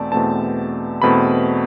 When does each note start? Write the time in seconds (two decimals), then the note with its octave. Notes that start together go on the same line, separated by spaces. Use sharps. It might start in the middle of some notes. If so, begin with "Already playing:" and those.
Already playing: E2 B2 A3 C4 D5 A5
0.12 E2 B2 A3 C4 A5
1.02 E2 B2 A3 C4 B5